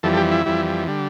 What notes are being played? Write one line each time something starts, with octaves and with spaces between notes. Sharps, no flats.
F2 E3 G3 A4
A4
G4
E4
F2 E3 G3
D3 G3